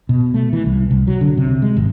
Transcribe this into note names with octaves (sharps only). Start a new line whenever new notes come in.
B2
A3
E3
C2
C2
F#3
D3
C3
G#3
G#1